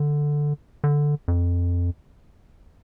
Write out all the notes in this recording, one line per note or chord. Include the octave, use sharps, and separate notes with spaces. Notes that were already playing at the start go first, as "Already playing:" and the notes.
Already playing: D3
D3
F2